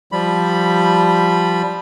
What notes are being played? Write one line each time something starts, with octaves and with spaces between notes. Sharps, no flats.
F3 G3 B5